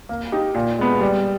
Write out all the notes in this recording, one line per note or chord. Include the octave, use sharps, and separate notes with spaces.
A#3
D#4 G4
A#2
G#3 B3
G3